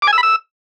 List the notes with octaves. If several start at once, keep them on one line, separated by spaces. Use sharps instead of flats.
D6
G#5
E6
B5
E6